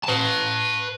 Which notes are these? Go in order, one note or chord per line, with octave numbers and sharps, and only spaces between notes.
B4 A5